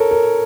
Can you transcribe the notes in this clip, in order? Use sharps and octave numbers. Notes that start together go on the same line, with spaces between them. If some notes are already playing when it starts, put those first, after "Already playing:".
Already playing: A4 A#4 C#5
A#4